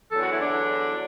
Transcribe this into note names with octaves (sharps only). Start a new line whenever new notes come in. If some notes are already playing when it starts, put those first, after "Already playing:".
E2 D3 F#3 A4
F#4
E4
D4
F#3